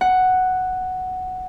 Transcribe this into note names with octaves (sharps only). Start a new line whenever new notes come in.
F#5